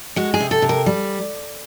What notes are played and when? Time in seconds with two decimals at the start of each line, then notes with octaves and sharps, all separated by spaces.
0.16 G#3 F#4
0.34 G#4
0.40 C3
0.51 A4
0.62 C3
0.69 A#4
0.86 G3